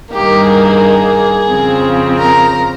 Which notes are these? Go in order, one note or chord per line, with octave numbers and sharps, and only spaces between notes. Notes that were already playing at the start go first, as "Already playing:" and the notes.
G2 D#3 A#3 G4
G#4
F2 C#3 F3 C4
A#4